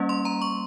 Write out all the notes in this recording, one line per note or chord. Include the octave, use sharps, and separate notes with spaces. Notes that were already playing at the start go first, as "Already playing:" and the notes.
Already playing: G3 A#3 C#4
C6
A#5
C#6